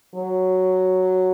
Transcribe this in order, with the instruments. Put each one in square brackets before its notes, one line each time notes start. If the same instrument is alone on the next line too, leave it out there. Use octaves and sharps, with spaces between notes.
[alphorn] F#3